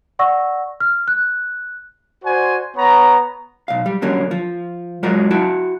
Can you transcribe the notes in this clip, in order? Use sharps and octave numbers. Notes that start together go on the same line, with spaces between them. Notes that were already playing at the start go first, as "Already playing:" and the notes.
D5 F#5 C#6 E6 A#6
F6
F#6
F#4 C5 D5 G#5
B3 C#5 A#5
B1 F5
G3
D3 F#3 G3 A#3 C#4
F3
F#3 G#3 F4 F#4 A#4 D#5
E4 F#4 G5 A5